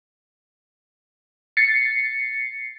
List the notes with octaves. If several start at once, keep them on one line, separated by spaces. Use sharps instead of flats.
A6 C7 C#7